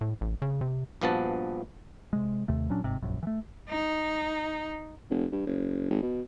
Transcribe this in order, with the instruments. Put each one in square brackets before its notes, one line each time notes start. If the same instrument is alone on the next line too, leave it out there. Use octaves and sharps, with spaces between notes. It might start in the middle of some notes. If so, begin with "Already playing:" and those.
[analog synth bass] A2
A1
C#3
C3
[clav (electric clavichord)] A#1 G2 F3 B3 F#4 A5
[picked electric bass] C3 G#3
D#2 C3 A3
A#2 F#3 C#4 D4
G1 G#2 C3
E1 A#1 F#2
E3 A3
[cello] D#4
[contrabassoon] F1
G2
F#1
G#1
B2